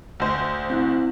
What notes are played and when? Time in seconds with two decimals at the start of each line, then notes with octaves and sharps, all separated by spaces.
0.20 D2 C5
0.70 C4 E4 F#6